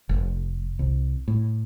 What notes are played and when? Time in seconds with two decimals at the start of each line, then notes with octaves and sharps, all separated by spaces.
0.09 F1
0.79 C2
1.28 A2